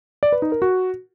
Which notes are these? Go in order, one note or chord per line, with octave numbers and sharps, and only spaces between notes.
D5
B4
D#4
A#4
F#4